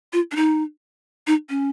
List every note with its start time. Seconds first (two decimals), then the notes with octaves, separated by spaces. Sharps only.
0.13 F4
0.31 D4
0.36 D#4
1.27 D#4
1.50 C#4